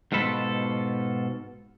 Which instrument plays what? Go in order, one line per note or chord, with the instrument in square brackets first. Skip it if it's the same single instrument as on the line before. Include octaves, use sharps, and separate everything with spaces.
[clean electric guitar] G#2 B2 F4 A4 B5